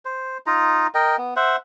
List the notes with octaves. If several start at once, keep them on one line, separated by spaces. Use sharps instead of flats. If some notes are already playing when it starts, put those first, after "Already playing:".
C5
D#4 F4 A#5
A#4 D#5 G5
B3
C5 E5 F#5